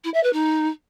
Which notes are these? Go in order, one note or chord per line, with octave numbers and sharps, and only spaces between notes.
E4
E5
B4
D#4